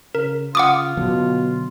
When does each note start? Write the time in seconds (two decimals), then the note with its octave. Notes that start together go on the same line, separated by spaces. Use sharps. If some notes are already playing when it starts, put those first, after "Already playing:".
0.15 C#3 A#4
0.55 C#3 F4 F#5 D6 D#6
0.97 B2 D3 F#3